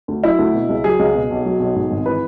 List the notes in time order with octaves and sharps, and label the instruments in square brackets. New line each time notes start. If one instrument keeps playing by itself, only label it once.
[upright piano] D2
F#3 E4
D2
B2
C#2
F#3 G#4
C#2
B2
B1
F#3
B1
G#2
G#1
E3 B4